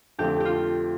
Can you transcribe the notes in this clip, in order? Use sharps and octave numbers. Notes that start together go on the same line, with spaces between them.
F2 D3 F3 A3 C4 G4
F4 G4